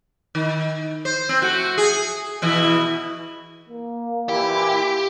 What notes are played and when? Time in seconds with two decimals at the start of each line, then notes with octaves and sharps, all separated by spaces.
0.35 D#3
1.05 C5
1.29 C4
1.42 A3 F#4
1.78 G#4
2.42 B2 E3 E4
3.69 A#3
4.29 A#2 E3 E4 G4